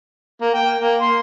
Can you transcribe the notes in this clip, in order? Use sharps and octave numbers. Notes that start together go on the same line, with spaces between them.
A#3
G5
A#3
C6